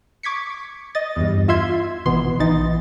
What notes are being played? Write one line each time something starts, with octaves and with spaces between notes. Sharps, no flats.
C#6 D6 G#6 B6 C#7
D#5 A6
E2 G2
F4 E5 C6 G#6
G#1 B2 E3 B3 C6
A#1 E3 D#4 A6